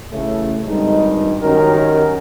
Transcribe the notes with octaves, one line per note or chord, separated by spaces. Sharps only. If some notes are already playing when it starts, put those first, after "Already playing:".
A1 C#3 A3
G#1 G2 G3 G#3 D#4
F#2 D#3 C#4 F#4 G4 A#4